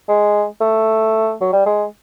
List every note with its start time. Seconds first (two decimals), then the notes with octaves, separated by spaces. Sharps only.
0.08 G#3
0.61 A3
1.41 F#3
1.53 G3
1.66 G#3